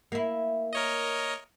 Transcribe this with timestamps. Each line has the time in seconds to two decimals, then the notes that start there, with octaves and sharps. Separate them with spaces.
0.12 A#3 E4
0.73 A#4 C#5 D#5